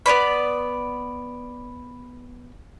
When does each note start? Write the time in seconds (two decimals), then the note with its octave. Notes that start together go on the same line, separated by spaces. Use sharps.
0.06 B3 C#4 D5 B5